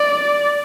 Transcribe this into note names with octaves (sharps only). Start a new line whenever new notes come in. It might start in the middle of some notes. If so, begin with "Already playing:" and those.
Already playing: D5